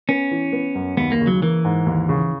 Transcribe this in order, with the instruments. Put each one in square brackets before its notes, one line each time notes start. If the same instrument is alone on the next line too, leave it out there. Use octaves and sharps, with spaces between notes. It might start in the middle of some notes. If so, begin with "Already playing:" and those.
[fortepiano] B3 [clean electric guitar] C#4
[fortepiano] E3
B3
F#2
[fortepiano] D#2 [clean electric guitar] B3
[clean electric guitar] A#3
[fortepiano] C#3
[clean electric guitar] F#3
[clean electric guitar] E3 [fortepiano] A#3
[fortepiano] G#2
D#2
C#3